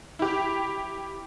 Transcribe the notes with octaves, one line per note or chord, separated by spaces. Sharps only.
E4 G4